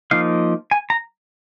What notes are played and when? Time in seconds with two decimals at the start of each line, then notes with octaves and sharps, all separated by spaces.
0.11 F3 A#3 D#4 F5
0.71 G#5
0.90 A#5